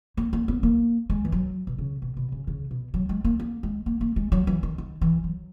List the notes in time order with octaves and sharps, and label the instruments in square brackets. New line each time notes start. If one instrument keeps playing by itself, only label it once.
[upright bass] A#3
A#3
B3
A#3
G#3
E3
F#3
B2
C#3
B2
B2
C#3
C#3
B2
F#3
G#3
A#3
A#3
G#3
A#3
A#3
G#3
F#3
E3
D#3
D#3
E3
F#3